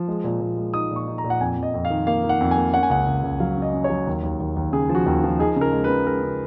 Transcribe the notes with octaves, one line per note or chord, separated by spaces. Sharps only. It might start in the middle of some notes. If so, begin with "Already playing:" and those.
Already playing: F3
G#3
A#2
A#2
G#3
D#4 D#6
A#2
C#6
D#4
A#5
A#2
F#5
F2 G#5
F2
D#5
F2
F5
D#3
A#3 F5
D#3
F#5
F2
G#5
A#3
C#4 F#5
G#5
C#2 F#5
C#2
C#2
F#3 F5
C#3 D#5
C#4
C#5
F#3
D#2
D#2
D#2
D#2
C#3 G#4
F3
F#4
D#2
F3
D#4 G#4
C#3
A#4
G#3
B4
C#3
G#3 A#4
C#3